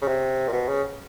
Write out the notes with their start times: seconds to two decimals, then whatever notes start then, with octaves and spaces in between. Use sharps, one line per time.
0.02 C#3
0.08 C3
0.48 A#2
0.53 B2
0.68 C#3